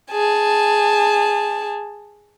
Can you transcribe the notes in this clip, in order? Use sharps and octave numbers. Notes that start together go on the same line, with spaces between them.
G#4 A5